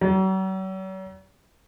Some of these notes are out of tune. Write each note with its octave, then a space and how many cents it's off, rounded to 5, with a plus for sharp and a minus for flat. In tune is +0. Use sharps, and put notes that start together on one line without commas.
F#3 +45